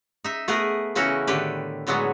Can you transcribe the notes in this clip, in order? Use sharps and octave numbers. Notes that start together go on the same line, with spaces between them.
D#4 E5
A3 B3 G#4 A#4 B4
C#3 E3 C#4 D#4 E4 F#4
A2 D3 D#3 G4 B4
A2 D3 F#3 G#3 B3